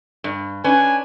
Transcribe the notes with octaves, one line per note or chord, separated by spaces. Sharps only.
G2
C#4 D4 B4 G#5